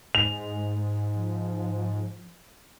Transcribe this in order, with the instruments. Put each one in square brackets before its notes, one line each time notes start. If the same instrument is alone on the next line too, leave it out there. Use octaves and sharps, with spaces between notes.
[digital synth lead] G#2 [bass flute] G#3 [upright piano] F7
[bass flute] F3